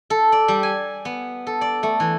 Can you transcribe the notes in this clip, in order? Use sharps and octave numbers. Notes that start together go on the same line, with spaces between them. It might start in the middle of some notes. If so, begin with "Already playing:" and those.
A4
D5
G3
G#5
B3
A4
D5
A3
E3